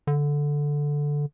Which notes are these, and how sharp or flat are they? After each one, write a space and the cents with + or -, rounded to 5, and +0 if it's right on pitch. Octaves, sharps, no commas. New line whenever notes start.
D3 -5